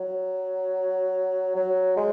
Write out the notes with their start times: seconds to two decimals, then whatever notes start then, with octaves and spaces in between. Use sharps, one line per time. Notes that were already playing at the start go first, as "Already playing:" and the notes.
Already playing: F#3
1.56 F#3
1.97 G#3